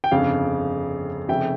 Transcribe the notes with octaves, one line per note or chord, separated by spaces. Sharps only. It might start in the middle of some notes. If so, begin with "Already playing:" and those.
G5
G1 F2 C#3 F5
F1 F2 C#3 E5 G5